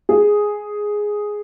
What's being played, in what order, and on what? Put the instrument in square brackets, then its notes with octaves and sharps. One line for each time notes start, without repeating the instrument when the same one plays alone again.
[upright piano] G#4